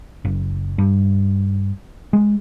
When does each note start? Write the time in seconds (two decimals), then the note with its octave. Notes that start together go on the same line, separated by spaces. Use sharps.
0.25 F#1
0.78 G2
2.13 G#3